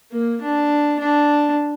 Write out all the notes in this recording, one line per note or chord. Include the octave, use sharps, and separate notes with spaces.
A#3
D4
D4